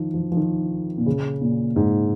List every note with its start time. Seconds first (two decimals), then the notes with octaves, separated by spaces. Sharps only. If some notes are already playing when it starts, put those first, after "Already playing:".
Already playing: D#3 F3
0.14 F3
0.32 F3
0.37 D#3
0.98 A#2
1.06 C#3
1.42 A#2
1.76 G#2